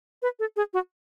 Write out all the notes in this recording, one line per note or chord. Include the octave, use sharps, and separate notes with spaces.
B4
A4
G#4
F#4